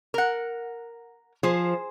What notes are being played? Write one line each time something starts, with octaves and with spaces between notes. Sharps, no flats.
A#4 F#5
F3 G#4 C5